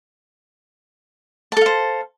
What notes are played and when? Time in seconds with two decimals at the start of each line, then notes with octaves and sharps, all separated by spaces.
1.52 A5
1.57 A4
1.61 F5
1.66 C5